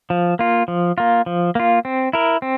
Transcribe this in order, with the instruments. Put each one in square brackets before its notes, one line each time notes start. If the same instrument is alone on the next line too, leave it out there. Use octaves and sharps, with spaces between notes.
[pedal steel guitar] F3
A#3 F4
F3
A#3 F4
F3
A#3 F4
C4
E4 A#4
C4